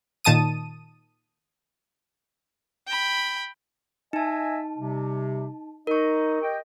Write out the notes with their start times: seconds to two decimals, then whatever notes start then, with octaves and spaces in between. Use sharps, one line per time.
0.24 A#2 D#3 A5 D#6 D#7
2.87 G5 B5
4.13 D#4 D#5 E5 G#5 A5
4.78 C3 G3
5.87 D#4 A#4 D#5 C#6
6.42 G4 D#5 G5